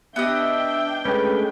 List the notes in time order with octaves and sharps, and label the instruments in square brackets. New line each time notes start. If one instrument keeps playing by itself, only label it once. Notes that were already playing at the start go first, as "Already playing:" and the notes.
[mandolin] B3 G4 D#5 [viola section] D4 G5 [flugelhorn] E5
[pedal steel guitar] G#3 A3 C#4 [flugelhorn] B4